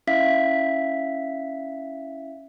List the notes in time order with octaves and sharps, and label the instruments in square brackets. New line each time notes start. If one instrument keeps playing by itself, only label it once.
[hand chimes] C#4 E4 E5 F5 B6